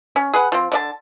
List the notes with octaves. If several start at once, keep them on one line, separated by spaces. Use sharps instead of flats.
C#4
G#4 B4 F#5
F3 C4
D3 D5 A5